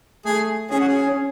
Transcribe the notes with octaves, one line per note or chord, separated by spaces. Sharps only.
A3 G#4
C#4 G#4
F#4
G#4